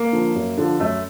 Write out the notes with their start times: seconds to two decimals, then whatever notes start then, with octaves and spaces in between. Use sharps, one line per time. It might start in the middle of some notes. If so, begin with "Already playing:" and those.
Already playing: A#3
0.13 D3 F3
0.35 F#2
0.57 D3 F3
0.80 F#2 A3